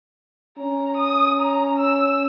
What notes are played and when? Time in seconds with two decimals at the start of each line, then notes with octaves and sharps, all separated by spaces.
0.59 C#4 A#5
0.97 D#6
1.41 A#5
1.78 E6